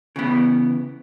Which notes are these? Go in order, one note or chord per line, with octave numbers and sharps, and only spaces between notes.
C#3 E3 B3